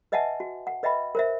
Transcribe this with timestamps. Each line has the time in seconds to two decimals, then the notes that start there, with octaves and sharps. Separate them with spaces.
0.12 B4 D#5 E5 F#5 G#5 A5
0.40 F#4
0.67 F#5
0.83 B4 D#5 E5 G5 B5
1.15 A#4 C5 E5